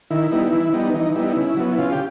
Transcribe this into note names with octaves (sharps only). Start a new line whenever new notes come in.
D#3 E4
G3 B3 D#4
E3
G3 B3 D#4
E3 D#4
G3 B3 D#4 E4
C#3
F#3 B3
E4
C#3 F4
G4